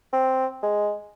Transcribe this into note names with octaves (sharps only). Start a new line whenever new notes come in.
C4
G#3